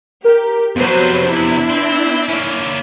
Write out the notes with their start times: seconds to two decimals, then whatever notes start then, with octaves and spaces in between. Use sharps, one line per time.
0.24 G4 A#4
0.76 F2 C3 F#3 B3 B4 C5
1.24 D4 E4
1.70 C4
2.29 A#3 C#4